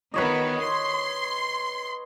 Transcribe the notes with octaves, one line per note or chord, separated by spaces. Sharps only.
D#3 B3 B4 C#5 D#5
C6